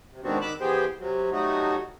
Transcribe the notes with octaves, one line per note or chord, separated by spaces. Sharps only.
C3
G#2 D#3 B3 C4 D4 F#4
D#3 B5 D6 E6 F#6
E3 B3 G4 G#4 C5 G5
C3 F#3
F#3 G3 A3 D#4 F#4